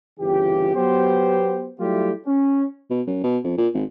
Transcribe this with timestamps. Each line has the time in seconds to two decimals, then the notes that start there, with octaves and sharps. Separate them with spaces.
0.20 G1 C#3 E3 F4 G4
0.75 F#3 B3 G4 C5
1.79 F#3 G3 A3 E4 F4 G4
2.26 C#4
2.90 B2
3.07 F#2
3.24 B2
3.44 F2
3.58 A#2
3.74 G#1